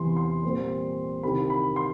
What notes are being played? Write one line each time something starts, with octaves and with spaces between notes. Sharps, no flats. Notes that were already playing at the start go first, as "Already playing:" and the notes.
Already playing: E2 C3 E3 C6
C6
A#2 G3 C4
C2 C3 D#3 B5
B5
C6